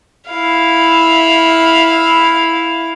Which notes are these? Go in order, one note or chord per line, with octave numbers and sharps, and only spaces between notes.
E4 F5